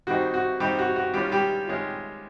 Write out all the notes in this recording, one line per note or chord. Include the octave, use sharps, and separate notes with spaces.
D#3 G3 C4 D#4 F#4
F#4
D#3 G3 C4 D#4 G4
F#4
F#4
D#3 G3 G#3 C#4 F4 G4
G3 G4
D#3 G#3 C#4 F4